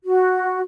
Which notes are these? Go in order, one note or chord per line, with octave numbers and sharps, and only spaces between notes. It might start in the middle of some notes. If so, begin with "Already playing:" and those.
F#4